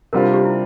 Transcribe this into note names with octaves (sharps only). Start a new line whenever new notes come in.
C3 G3 D4 F4 A#4 C5
G4
E4